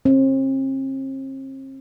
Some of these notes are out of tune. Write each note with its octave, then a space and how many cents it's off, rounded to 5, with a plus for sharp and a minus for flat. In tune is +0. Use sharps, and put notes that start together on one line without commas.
C4 +40